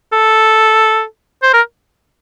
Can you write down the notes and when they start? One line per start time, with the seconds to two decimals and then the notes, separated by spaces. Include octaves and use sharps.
0.13 A4
1.43 C5
1.54 A#4